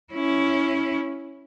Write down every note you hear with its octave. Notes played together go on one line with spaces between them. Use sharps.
C#4 E4